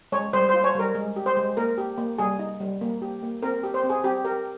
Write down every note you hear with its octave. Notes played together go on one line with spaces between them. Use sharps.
G#3 C#5
G3 C5
C5
F4
C#5
G3 A#4
G#3
G4
C5
G#3
A#3 A#4
G4
A#3
G3 G#4
D#4
G3
A#3
G4
A#3
C4 A#4
G4
C5
C4
G#4
C4 G4
G4 A#4